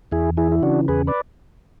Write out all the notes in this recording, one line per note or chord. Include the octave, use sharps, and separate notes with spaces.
E2 E4 G#4
E3 E4 G#4
E4
C#3 D4 F#4
E2 G#4 B4
B4 D5